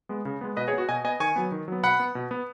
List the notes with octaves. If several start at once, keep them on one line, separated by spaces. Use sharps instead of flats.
G#3 B3
C#3
G#3 B3
B2 B4 D#5
G#4 C#5
B3
F#4
B2 D#5 G#5
B3 D#5 G#5
D#3 G#5 C#6
F#3 B3
D#3
F#3 B3
B2 F#5 B5
B3
B2
B3